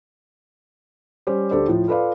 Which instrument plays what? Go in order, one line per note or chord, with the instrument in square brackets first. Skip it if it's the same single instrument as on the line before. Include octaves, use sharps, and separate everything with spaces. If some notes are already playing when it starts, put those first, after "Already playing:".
[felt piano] G3 C#4 G4 C5
D2 G4 A4 C5 D5
A2 F3
F4 A4 B4 D5 F5